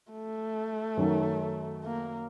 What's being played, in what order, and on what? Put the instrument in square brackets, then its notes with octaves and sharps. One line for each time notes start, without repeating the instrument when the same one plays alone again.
[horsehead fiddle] A3
[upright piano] F#2 D#3 F#3
[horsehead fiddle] A#3